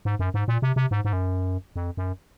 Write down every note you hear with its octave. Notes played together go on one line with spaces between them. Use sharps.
G#2
F#2
G#2
A#2
C3
C3
G#2
G#2
F#2
F2
F#2